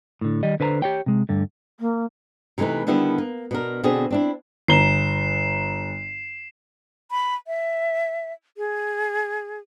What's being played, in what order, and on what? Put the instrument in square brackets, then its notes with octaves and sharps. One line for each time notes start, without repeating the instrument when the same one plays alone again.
[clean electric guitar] A2 D3
D#3 G3 D#5
D3 B4 C5 A5 A#5
G4 C#5 G5
C3 G#3
D2 G2 D3
[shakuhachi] A#3
[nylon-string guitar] C3 E3 A3 D#4 B4
D3 D#3 G3 B3 E4 A4
A#3
B2 D4 A#4
B2 D3 B3 C4 D4 G#4
C4 D4 E4
[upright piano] G1 A#5 G7 [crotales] C7 E7
[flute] B5
E5
G#4